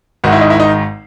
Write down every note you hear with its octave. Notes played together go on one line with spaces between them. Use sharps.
G#1 G#2 D#3 F#4
E4
D#4
E4
D#4